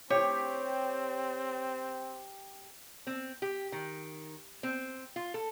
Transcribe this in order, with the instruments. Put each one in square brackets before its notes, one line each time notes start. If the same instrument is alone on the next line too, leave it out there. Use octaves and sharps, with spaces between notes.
[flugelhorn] C4 [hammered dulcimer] G4 [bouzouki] C#5
[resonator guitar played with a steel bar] C4
G4
D#3
C4
F4
A4